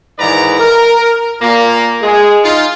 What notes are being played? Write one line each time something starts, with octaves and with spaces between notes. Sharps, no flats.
G#2 D#3 E3 B4 D5 A#5
A#4
A#2 A#3
G#3 G#4
D#4 F4